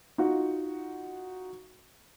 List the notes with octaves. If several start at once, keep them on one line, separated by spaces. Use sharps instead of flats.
D#4 F4 F#4